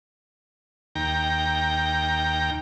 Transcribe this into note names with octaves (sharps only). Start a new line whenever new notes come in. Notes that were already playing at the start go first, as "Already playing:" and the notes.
D#2 G5 A#5